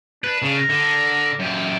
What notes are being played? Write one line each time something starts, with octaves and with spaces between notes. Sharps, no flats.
D4 B4
C#3
A#4
D3
F#2 G4